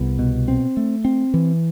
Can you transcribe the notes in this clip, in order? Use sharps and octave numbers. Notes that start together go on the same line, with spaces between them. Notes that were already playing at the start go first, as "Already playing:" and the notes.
Already playing: C2 B3
B2
C4
A3
C4
E3